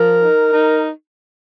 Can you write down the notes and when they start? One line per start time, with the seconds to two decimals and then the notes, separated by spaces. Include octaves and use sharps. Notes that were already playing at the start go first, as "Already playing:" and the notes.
Already playing: F3 A#4
0.22 D#4
0.53 D#4